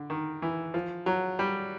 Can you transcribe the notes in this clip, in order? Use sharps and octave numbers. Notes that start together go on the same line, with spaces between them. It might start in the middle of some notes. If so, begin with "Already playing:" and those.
Already playing: D3
D#3
E3
F3
F#3
G3